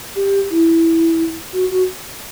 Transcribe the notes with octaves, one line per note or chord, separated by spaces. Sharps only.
G4
E4
F#4
F#4